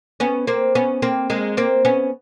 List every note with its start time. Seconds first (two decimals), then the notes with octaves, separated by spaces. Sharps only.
0.20 B3 C#4
0.47 A#3 C4
0.75 B3 C#4
1.02 A#3 C4
1.30 G#3 A#3
1.57 A#3 C4
1.85 B3 C#4